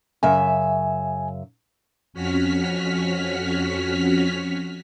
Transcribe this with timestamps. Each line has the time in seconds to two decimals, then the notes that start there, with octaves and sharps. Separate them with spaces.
0.23 F#2 C#3 E5 G#5
2.13 F2 C#4 F#4 F6 B6